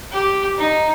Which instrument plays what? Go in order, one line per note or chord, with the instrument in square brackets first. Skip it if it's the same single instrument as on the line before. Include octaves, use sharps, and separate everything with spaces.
[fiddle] G4
D#4